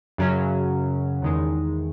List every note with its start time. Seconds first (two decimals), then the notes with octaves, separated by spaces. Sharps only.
0.18 F#2 C#3 F#3 C#4
1.22 E2 D#3 G#3